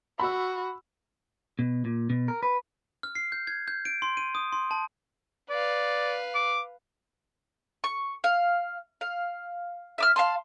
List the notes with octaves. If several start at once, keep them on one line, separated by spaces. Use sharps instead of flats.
F#4 B5 E6
B2
A#2
B2
A#4
B4
F6
C7
G6
G#6
G6
D7
C6
D#7
D#6
C6
A5
B4 D5 F5
D6
C#6
F5
F5
E5 D6 F6
F5 A5 C6